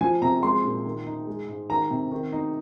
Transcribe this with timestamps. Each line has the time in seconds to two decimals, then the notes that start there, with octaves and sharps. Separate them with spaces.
0.01 F3 G#5
0.22 C3 A#5
0.43 G#3 C6
0.64 A#2
0.85 D#3
1.06 D#4
1.27 G#3
1.48 G#2
1.69 D#3 A#5
1.90 C3
2.11 D#3
2.32 D#4